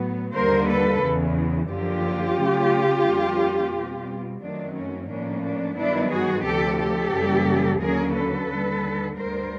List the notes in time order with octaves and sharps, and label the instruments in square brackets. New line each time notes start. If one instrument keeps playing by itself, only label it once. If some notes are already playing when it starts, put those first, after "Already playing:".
Already playing: [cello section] A2 F#3 B3
D#2 D3 G3 A#3 A#4 C5
A4 B4
E2 C#3 E3
F#2 D3 F3 A#3 F4 G4
C#3 F#3 A3 C#4
F2 D3 G3 A#3 C#4
B2 G3 C4
F#2 D#3 F#3 A3 C4 D4
C#4
A2 F3 A#3 C#4 D4
D4
G2 D#3 F#3 B3 D4 E4
F#4 G#4
D2 C3 F3 G4 A4
G4 A4
F#2 C#3 E3 G3 A#3
D#2 D3 F#3 A#3 C#4 G#4 A#4
A4 B4
D#2 D3 G3
D2 D3 G3 B3 A#4 C5